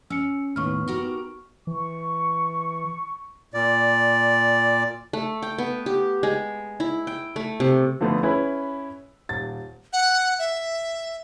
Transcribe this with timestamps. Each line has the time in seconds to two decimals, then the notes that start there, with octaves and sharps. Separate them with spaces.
0.10 C#4 E6 C#7
0.56 D#2 A2 B3 D#4 B4 C#6 F6
0.88 F#4 G4 A#4
1.67 E3 C#6
3.54 A#2 D5
5.13 A3
5.42 G5
5.58 B3
5.86 G4
6.23 G#3
6.80 E4
7.07 G5
7.36 A3
7.60 C3
8.01 D3 F3 A3 B3
8.23 C#4 E4 G#4 B4 B5
9.29 D#1 A6
9.93 F#5
10.39 E5